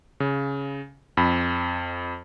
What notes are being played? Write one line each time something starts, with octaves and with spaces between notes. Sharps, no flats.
C#3
F2 B5